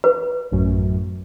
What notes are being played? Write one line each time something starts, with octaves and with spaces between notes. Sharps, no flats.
B4
A1 F#2